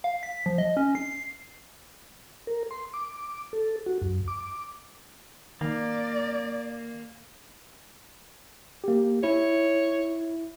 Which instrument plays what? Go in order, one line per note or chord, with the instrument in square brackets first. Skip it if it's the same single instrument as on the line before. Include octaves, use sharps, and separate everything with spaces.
[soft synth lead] F5
B6
F3
D#5
C#4
C7
[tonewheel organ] A#4
C6
D6
A4
F#4
F#2
D6
[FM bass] D#3 [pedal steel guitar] A#3 [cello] D5
[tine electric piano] A#3 G4
[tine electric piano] E4 [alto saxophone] C#5